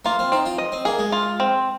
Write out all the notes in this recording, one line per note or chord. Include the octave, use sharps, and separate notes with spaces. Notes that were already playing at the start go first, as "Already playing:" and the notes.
A#3 F4
C4
C4 D#4
F4
D#5
C4
A#3 G#4
G#3
F4
C4